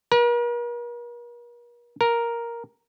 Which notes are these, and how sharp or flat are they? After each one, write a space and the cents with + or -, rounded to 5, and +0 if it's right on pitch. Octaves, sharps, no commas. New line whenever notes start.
A#4 +45
A#4 +5